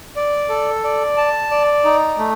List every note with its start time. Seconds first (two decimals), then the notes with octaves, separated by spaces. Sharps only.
0.16 D5
0.49 A4
0.84 D5
1.17 A5
1.51 D5
1.85 D#4
2.18 A3